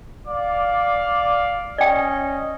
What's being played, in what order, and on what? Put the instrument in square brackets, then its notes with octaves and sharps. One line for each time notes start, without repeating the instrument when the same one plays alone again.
[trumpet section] D5 F5
[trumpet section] C#4 D#5 [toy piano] D5 G5